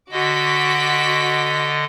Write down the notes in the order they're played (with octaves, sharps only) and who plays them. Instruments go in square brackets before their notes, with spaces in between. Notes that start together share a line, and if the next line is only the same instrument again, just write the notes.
[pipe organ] D3 D#5 [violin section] F#4 D6 B6